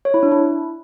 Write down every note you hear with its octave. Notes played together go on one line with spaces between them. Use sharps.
C#5
E4
D4
E4